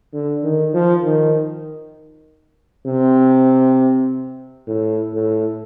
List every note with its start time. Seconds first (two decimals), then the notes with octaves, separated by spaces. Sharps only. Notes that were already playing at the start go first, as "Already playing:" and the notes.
0.13 D3
0.44 D#3
0.74 F3
1.04 D#3
2.86 C3
4.68 A2
5.14 A2